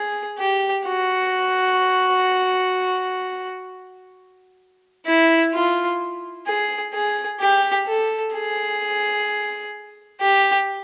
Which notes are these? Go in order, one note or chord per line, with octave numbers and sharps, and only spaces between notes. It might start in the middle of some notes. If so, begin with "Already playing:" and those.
Already playing: G#4
G4
F#4
E4
F4
G#4
G#4
G4
A4
G#4
G4